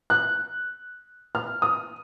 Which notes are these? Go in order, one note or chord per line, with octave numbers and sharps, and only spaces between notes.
F#6
F6
D#6